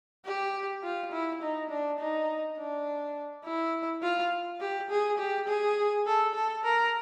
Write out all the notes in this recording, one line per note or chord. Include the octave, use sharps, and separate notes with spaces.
G4
F4
E4
D#4
D4
D#4
D4
E4
F4
G4
G#4
G4
G#4
A4
A4
A#4